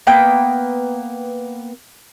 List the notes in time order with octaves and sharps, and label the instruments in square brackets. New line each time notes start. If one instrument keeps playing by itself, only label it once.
[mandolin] A#3 B3 G5